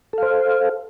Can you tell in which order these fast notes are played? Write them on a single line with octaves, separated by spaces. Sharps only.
A4 F5 C5